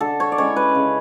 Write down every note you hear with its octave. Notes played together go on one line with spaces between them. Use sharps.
D3 A4
C#5
D5
G#3 C#4 E4 C#5
B4
C#3